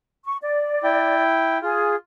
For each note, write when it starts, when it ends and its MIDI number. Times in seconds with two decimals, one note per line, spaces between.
0.25 0.37 85
0.42 1.22 74
0.83 1.58 64
0.83 1.58 79
1.62 1.95 65
1.62 1.94 68